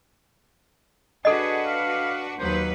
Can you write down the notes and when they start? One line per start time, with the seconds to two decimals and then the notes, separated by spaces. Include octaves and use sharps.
1.25 D4 F#4 G#4 A4 B4 D#5
1.66 F5
2.39 D#2 F#3 B4 C5